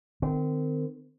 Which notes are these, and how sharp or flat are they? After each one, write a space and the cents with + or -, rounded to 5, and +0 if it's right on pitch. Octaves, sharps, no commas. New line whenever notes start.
D#3 -35 C4 -30